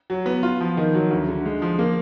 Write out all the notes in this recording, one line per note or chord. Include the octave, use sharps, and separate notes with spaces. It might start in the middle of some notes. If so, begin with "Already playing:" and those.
F#3
B3
F4
F3
D#3
F#3
D2
D3
G#3
F3
A#3